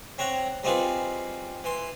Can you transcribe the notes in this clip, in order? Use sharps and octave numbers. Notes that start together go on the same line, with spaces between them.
C4 C#5 F#5 A#5
G3 C4 D#4 F4 G#4 B4
E3 C6